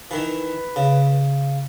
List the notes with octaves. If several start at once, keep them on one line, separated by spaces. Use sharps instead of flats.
D#3 E3 B4
C#3